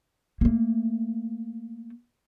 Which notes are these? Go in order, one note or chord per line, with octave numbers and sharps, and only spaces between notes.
A3 A#3